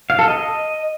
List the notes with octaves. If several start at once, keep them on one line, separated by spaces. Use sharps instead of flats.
F5
A4
D#5